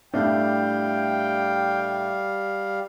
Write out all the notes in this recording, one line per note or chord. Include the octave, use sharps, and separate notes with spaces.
A2 G3 A3 D4 F5 G5